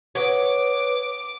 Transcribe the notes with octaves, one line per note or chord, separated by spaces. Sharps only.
B4 C#5 F#5 D6 D#6